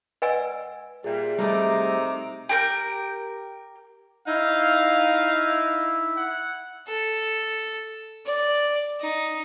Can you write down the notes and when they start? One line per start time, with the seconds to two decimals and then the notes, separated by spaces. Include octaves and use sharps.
0.22 B4 D5 D#5 F#5 G#5 E6
1.04 A#2 G3 G#4 E5
1.39 C3 G3 A3 D#4 A#5 D6
2.49 G4 A#4 G6
4.27 D#4 E4 F5
6.17 F#5
6.87 A4
8.26 D5
9.01 D#4